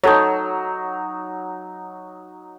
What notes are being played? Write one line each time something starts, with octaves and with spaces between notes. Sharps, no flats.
F#3 D#4 A4 C#5